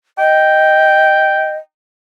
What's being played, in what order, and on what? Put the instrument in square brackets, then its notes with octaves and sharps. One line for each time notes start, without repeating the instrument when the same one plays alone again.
[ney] D#5 [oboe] G5